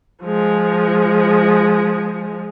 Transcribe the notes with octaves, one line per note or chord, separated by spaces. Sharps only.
F3 G#3